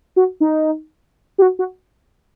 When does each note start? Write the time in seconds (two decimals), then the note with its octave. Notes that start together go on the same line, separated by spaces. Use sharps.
0.16 F#4
0.40 D#4
1.38 G4
1.42 F#4
1.59 F#4